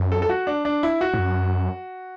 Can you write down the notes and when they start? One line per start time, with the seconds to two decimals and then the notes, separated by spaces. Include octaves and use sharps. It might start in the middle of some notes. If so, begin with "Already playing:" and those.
Already playing: F#2
0.12 A4
0.22 A4
0.29 F#4
0.47 D4
0.65 D4
0.83 E4
1.01 F#4
1.14 A2
1.18 F#2